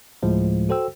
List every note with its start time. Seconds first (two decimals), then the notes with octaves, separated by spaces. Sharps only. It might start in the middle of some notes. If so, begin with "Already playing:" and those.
0.23 D2 A2 F3 G#3
0.69 F#4 A4 C5 G5 E6